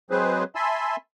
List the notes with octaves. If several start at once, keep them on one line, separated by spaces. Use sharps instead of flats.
F#3 G#3 C4 G#4 B4 C5
E5 G#5 A5 B5 C6 E6